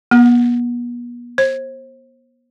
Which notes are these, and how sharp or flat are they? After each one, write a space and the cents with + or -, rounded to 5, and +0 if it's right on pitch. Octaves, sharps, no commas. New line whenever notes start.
B3 -40
C5 +30